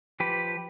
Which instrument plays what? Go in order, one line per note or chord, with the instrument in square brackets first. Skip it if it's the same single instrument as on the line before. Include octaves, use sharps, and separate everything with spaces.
[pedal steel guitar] F3 G4 B4